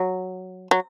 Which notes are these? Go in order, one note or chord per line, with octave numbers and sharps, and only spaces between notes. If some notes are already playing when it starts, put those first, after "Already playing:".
Already playing: F#3
F#3